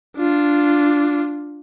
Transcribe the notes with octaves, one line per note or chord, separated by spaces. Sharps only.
D4 F4